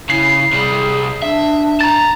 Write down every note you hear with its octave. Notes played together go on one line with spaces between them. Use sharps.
C#3 E4 C7
C3 G3 G#4
D4 E5
A5 A#5 A6